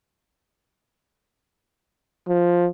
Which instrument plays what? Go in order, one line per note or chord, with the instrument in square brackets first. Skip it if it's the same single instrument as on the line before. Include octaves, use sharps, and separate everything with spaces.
[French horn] F3